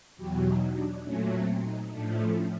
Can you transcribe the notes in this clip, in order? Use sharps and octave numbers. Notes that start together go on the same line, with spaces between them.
E2 B2 F#3 G4
D#4
D4
A#2 F#3 A3 C#4
C4
D#4
A2 F3 A3 D4
C#4